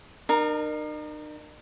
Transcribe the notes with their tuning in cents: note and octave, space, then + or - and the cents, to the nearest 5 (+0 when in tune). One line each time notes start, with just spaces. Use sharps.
D#4 -45 A#4 +0